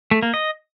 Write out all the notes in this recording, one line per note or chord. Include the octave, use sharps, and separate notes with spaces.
A3
A#3
D#5